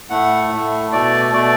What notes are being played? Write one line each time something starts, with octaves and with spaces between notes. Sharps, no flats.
A2 A3 F#5
A2 A3
B2 A3 D5
B2 A3 D5